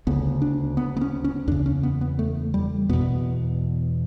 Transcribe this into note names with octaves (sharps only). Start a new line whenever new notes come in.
D2 C#3 B3
D4
B3
B3
C#4
C#4
E2 C#3 D4
C#4
B3
B3
A3
G3
E2 B2 B3